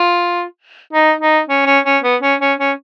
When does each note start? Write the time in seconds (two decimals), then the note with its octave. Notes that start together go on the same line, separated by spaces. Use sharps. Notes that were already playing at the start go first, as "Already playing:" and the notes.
Already playing: F4
0.93 D#4
1.21 D#4
1.49 C#4
1.66 C#4
1.85 C#4
2.03 B3
2.22 C#4
2.40 C#4
2.59 C#4